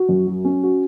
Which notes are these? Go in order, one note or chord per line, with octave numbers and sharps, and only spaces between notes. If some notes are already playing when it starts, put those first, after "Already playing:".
Already playing: F#4
F#2
F#3
C#4
F#4